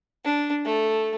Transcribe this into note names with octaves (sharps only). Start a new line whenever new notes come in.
D4
A3